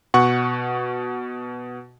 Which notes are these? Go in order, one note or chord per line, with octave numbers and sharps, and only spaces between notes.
B2 F#5 C#6